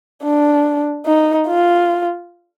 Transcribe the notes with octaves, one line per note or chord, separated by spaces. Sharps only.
D4
D#4
F4